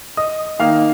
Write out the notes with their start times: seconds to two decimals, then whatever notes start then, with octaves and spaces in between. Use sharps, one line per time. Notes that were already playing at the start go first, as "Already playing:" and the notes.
0.17 D#5 D#6
0.59 D#3 A#3 D#4 F5 F6